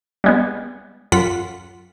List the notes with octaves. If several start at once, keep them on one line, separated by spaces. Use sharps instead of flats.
G3 G#3 B3
F#2 F4 F#5 B6